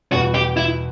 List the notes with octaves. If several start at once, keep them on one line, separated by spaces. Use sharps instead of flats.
E2 B2 G3 B3 F#4
G4
E4